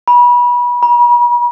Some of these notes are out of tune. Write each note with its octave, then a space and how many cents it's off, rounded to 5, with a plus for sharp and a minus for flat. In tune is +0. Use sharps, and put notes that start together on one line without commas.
B5 -30
B5 -45